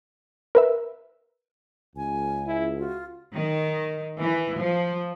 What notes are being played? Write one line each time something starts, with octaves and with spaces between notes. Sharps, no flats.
A#4 B4 E5
C#2 G#5
E4
F4 F#4
D#3
E3
F3